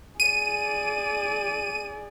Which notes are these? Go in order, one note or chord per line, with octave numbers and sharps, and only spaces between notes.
G#4 D5 D#7